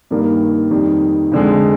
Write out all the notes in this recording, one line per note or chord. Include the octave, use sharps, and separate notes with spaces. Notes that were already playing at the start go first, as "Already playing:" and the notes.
G2 D#3 A#3
F2 D#3 G3
F2 D3 G#3